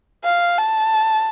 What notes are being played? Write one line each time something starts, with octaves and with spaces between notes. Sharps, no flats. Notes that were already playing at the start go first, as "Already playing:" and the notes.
F5
A5